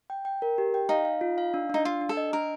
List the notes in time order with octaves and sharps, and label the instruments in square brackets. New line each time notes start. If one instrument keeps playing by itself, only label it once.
[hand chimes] G5
G5
A#4
G4
G5
[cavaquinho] D#4 [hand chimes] F5
[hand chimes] F5
F4
F5
D4
[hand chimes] D4 [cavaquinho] D#4
[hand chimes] D4 [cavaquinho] F4
[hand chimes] D4
[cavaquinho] A4
[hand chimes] D#5
[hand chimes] D4 [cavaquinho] A#4